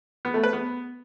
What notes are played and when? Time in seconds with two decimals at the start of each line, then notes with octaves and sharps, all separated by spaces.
0.25 B3
0.34 A3
0.44 B4
0.53 B3